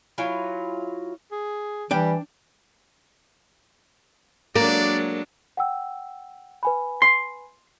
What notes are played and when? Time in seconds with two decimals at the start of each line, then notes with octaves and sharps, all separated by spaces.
0.18 F#3 E4 F4 G#5
1.32 G#4
1.91 E3 G3 D4 G5
4.56 F#3 G#3 A#3 D4 D5
5.57 F#5 G5 E6
6.63 B4 G#5 B5
7.02 C6